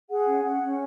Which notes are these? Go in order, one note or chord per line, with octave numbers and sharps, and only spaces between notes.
G#4 F#5
C#4
C#4 F#5
C#4